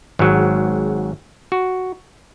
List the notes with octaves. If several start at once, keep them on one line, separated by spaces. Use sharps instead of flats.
G#1 G#2 F#3
F#4